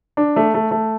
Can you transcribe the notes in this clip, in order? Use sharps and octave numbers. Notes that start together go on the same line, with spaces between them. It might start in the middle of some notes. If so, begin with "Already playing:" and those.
D4
A3
A3
A3